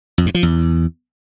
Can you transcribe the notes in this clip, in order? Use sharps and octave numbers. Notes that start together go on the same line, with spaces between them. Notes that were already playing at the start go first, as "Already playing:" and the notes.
F2
G2
F3
E2